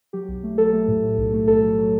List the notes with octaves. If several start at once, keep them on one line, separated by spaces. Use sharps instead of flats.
F#3 G4
B1
A3
F#3 A4
A3
A2
A2
B1
A3
B1 A4
F#3
F#3